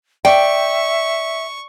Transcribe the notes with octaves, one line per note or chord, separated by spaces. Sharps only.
D5 E5 G5 C#6